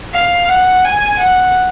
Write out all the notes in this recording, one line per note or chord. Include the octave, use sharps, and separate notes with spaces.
F5
F#5
G#5
F#5